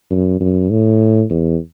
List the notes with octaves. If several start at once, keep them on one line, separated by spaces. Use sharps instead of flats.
F#2
F#2
A2
E2